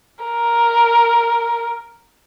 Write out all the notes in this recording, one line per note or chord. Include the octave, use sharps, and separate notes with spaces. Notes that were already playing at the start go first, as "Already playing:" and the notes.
A#4